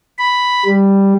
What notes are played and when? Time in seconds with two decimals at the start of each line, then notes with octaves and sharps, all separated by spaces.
0.19 B5
0.65 G3